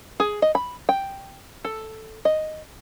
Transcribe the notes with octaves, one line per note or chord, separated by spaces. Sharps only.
G#4
D#5
B5
G5
A4
D#5